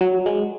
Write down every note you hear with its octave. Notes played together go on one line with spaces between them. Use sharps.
F#3
G#3